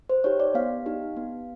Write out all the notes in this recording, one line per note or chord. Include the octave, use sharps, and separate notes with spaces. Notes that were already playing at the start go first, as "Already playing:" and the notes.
C5
D#4 G4 C#5
D5
B3 F5
D#4 G4
B3